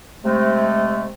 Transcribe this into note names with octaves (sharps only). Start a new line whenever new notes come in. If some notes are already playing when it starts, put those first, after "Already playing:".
C3 G#3 A3